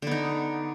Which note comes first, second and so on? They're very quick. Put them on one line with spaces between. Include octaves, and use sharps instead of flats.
D3 B3 D#4